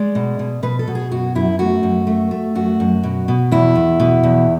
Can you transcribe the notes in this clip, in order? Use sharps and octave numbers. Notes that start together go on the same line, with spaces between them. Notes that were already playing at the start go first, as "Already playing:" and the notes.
Already playing: G#3 D5
B2
B2
B2 B4
A4
B2
G#4
F#2 F#4
F#2 E4
A3 F#4
F#2
A3
A3
F#2 F#4
F#2
B2
B2
E2 E4
E2
B2
E2